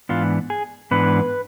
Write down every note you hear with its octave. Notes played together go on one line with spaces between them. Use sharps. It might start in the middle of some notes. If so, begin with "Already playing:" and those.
G#2 E3 B3 D4 F4
G#4
G#2 E3 B3 D4 B4